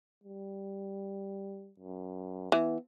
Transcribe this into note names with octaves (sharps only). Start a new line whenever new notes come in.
G3
F#2
E3 B3